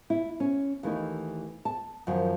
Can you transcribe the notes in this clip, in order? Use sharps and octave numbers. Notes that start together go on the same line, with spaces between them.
E4
C#4
D#2 E3 A3 D#4
A5
F#2 D#3 F3